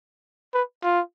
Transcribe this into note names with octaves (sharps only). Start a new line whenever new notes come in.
B4
F4